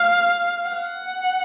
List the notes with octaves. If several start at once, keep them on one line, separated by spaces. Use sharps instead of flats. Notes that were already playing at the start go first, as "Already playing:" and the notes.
Already playing: F5
F#5